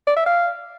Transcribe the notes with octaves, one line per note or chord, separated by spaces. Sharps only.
D5
E5
F5